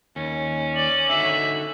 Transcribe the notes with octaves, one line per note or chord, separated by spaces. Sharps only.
D#2 C#4
D5 F#7
D3 D#4 F#4 E5